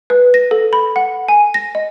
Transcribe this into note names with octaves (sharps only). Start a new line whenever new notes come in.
B4
A#6
A4
B5
F#5
G#5
A#6
D#5